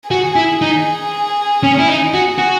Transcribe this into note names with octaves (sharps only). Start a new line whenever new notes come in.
F#4 G#4
E4
D#4
C#4
E4
D#4
F#4
F#4